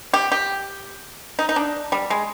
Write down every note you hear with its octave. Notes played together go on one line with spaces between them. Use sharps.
G4
G4
D#4
D#4
D4
G3
G#3